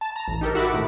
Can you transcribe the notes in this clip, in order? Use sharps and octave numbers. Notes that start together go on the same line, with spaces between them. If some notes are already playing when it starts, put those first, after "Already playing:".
A5
A#5
A1
D#4 G4 A4 A#4
F#4 E5 F#5 B5 D6
A2 D#3